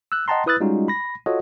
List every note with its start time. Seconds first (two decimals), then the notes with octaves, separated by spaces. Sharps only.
0.12 E6 F#6
0.28 D#5 F#5 G5 A5 A#5 C6
0.46 E4 B4 D#6 E6 F#6 A6
0.60 G3 G#3 C#4 D#4 F4 F#4
0.88 B5 A#6
1.26 F4 F#4 A4 C#5 D#5 F#5